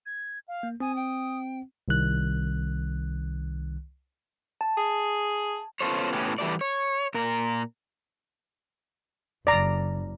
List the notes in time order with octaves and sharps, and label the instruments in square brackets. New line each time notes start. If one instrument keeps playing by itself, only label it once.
[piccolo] G#6
F5
[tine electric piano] A#3
[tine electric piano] C4 [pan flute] G#5 [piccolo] D#6
[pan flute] G5
[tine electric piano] C2 D#3 F#6
[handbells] A5
[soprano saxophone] G#4
[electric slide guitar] B3 C#4 F4 A4 C5 C#5
A2 B3 C#4 G4
E3 G3 A3 D5
C#5
A#2 A#4
[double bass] F#1 [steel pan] D5 A#5